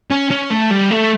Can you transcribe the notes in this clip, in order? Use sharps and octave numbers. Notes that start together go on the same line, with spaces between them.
C#4
C#4
A3
G3
A3